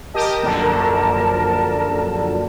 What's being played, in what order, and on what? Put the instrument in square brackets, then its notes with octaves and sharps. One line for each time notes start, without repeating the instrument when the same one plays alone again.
[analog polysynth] G4 D#5 [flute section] A#4 A5
[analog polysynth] A#1 F#2 D3